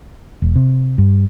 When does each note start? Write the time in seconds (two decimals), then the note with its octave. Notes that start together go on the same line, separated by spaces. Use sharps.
0.42 E1
0.56 C3
0.98 G2